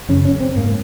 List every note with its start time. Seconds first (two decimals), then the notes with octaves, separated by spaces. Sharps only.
0.09 F#2 C#3 C#4
0.25 C#4
0.40 C4
0.56 G#2 A#3